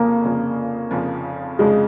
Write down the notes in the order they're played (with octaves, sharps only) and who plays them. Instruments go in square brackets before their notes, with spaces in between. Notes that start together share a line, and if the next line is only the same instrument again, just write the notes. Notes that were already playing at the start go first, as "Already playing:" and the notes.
Already playing: [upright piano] F1 F2 C#3 F3 [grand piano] A#3
[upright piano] F1 F2 C#3 F3
F1 F2 C#3 F3
[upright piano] F1 F2 C#3 F3 [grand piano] G#3